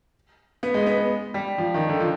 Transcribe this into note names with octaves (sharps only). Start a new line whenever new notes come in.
B3
G#3
B3
B3
G3
F3
D#3
D3
F3